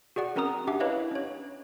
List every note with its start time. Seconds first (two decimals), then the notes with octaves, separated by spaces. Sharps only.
0.16 F#4 G#4 D5 F#5
0.36 C4 C#4 A#4 F#5 A#5 D#6
0.67 D4 G4 E5 F#5 D6
0.80 E4 B4 C#5 D#5 F5
1.11 C#4 C#5